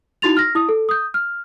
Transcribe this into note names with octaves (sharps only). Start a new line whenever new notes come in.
D#4 E4 F#4 C6 A6 F7
F6 A#6
E4 D#6
A4
D#6 G6
F6